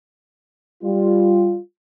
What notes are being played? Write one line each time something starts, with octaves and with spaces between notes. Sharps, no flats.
G3 F4